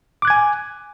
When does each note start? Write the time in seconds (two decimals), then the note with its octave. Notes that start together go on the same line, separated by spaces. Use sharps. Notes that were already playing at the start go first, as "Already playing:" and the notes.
0.22 D6
0.25 F#6
0.28 G#6
0.30 G#5